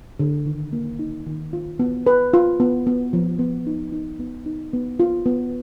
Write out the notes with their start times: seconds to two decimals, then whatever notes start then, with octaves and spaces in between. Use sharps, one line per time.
0.20 D3
0.46 D#3
0.73 A#3
0.99 D#4
1.26 D#3
1.53 F4
1.79 B3
2.07 B4
2.33 F4
2.60 B3
2.87 B3
3.13 F3
3.39 B3
3.67 D#4
3.92 D#4
4.19 B3
4.46 D#4
4.73 B3
5.00 F4
5.26 B3